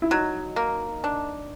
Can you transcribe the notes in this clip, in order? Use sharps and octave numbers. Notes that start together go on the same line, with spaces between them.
E4
F#3 D#4
A#3
D4